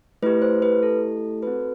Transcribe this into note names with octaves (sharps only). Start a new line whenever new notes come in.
A3 E4 G4 B4
C5
B4
A4
C4 F#4 A4 B4